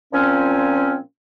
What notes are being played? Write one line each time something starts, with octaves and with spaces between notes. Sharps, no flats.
A#2 F3 C4 C#4